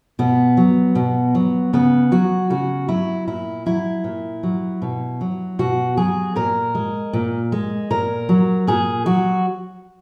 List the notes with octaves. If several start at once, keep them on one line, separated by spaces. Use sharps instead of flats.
B2 B3
F#3
B2
F#3
C#3 B3
F#3 F#4
C#3 F#4
F#3 E4
A#2 E4
F#3 E4
A#2
F#3
B2
F#3
B2 F#4
F#3 G#4
A#2 A#4
G#3
A#2
G#3
A#2 A#4
F#3
A#2 G#4
F#3 F#4